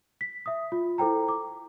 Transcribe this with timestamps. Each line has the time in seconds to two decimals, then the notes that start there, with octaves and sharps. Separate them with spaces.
0.21 B6
0.46 E5 D#6
0.72 F4
0.98 E4 A4 C5 G5 A#5
1.28 D6